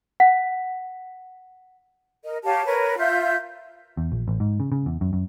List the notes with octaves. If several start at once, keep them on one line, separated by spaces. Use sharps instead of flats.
F#5 B6
A#4 D#5
G4 C#5 F5 A5
A#4 B4 C#5
F4 E5 G6
E2
A#1
A1
G#2
C#3
C#3
E2
F#2
F#2